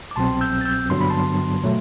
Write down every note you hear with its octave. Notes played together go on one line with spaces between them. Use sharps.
D6
C2 B2 F#3 C4 A5 C6
E6 G6
A6
E6 G6
G2 D3 F#3 B3 D4 C6
B5
A5 C6
B2 F#3 A3